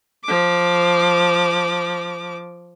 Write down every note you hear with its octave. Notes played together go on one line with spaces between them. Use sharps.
F3 D6